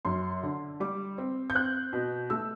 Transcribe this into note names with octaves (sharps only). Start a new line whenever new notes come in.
F#2 C6
D3
G3 D6
C4
G6
C4 F#6
B2
A3 E6